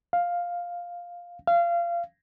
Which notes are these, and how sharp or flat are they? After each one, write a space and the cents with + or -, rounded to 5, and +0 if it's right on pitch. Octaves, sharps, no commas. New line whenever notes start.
F5 +5
F5 -25